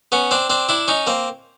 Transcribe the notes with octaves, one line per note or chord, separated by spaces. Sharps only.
B3 C#4
C4 D4
C4 D4
D4 E4
C#4 D#4
A#3 C4